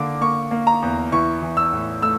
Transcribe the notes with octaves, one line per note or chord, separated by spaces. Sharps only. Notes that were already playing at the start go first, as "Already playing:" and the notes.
Already playing: D3 A#3 D6
A#3 C#6
A#3
A#5
E2
E3 C#6
E3
E6
A2
A3 E6